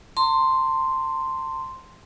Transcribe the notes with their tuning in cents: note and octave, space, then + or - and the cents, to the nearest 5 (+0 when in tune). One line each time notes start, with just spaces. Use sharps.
A5 +45 C6 +0